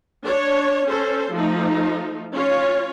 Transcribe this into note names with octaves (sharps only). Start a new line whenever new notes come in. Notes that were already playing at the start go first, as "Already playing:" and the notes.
D4 C#5
C#4 A4 C5
F3 A3 D#4
C#4 F4 C#5